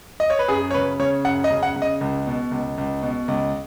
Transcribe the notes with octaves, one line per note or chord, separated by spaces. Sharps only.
D#5
C#5
B4
F#2 G#4
C#5
C#3 B4
C#3 C#5
F#2 F#5
D#5
C#3
F#5
C#3
D#5
C#2
B2
C#2
C#2
B2
C#2